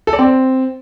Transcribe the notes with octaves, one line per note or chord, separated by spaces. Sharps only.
A4
D5
C4